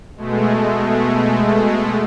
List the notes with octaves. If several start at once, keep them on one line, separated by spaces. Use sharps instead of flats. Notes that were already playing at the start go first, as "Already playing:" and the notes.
B2 G#3 A3